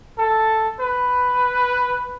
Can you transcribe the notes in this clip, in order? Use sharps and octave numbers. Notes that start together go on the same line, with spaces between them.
A4
B4